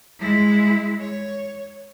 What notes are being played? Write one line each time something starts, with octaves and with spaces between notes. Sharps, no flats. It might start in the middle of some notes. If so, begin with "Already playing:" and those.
G#3 E4
C#5